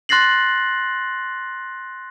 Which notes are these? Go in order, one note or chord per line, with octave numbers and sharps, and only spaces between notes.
C6 F#6 A6 A#6 C7 F#7